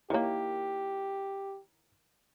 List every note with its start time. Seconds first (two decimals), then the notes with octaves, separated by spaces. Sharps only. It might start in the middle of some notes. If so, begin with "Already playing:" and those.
0.10 D#3 A#3 E4 G4 A#4 C#5